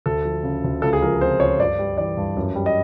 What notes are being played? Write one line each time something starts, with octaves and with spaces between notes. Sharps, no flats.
D2 A4
F3
C#3
D2
C#2 A4
G#4
F3 A#4
C3 C5
C#2 C#5
G2 D5
G3
E3 D5
G2
F#2
G3
D#5